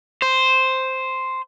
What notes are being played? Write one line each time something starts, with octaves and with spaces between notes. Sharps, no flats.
C5